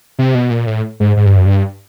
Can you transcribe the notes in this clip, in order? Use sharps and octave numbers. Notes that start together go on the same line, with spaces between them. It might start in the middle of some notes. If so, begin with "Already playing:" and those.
C3
B2
A#2
A2
G#2
G#2
G2
F#2
G2